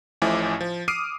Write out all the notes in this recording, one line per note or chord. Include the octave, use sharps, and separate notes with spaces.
A1 A2 F3 E4 G#5 D6
F3
D6 D#6 F6 C7 D7 D#7